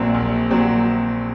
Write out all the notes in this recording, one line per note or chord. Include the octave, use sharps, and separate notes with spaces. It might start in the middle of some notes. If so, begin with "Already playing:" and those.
Already playing: A#1 A#2 F#3 C4
A#1
A#2 F#3 C4